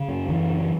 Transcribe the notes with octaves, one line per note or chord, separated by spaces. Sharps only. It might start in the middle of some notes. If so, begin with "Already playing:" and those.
Already playing: C#3
F#2
F#2 E3
C#3